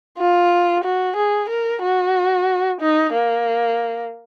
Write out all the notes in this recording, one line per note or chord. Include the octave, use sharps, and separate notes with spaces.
F4
F#4
G#4
A#4
F#4
D#4
A#3